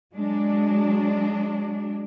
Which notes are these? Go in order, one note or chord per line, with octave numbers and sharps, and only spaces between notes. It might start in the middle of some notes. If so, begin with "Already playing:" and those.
F#3 G#3 D4